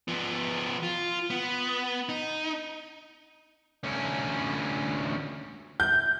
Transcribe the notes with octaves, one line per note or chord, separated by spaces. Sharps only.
F3 B3
F4
B3
D#4
D2 C#4
G6